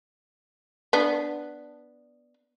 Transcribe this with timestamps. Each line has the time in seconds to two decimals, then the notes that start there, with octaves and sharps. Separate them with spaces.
0.93 B3 D4